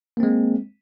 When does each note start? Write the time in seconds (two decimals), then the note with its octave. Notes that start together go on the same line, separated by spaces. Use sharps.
0.17 A#3
0.20 C4
0.23 G#3